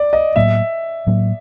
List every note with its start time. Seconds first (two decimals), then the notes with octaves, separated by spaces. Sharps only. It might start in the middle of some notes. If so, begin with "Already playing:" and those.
Already playing: D5
0.13 D#5
0.36 A2 F#3 A#3 E5
1.07 A2 F#3 A#3